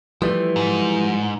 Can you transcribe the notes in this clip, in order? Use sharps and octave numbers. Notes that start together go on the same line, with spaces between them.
E3 F3 G3 A3
G#2